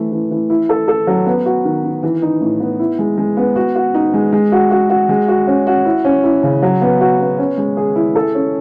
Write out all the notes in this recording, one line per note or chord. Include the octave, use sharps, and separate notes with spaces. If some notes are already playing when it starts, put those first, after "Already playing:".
Already playing: E3 A3
E3
E3
E4
A4
A4
F#3
B3
F#4
D#3
D#3
E3
D#4
A2
B3
E4
G#3
G#3
B3
F#4
F#4
D#4
G#3
G#3
F#4
F#4
F#4
G#3
F#4
C#4
F#4
E4
C#4
E4
C#3
F#3
B3
F#4
B3
C#4
G#3
G#4
E4
A4
C#4